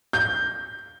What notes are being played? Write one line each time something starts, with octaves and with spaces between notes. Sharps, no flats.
G6